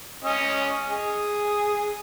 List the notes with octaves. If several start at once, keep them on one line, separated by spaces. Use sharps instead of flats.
C#4 D#5
G#4